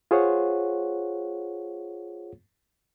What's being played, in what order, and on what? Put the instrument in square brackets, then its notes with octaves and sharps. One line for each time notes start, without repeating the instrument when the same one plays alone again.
[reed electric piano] F4 G#4 C5 C#5 F#5